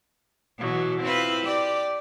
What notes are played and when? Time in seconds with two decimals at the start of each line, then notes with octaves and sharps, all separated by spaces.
0.58 B2 E3 F#3
1.02 C4 E4 F4 B4
1.44 G4 D5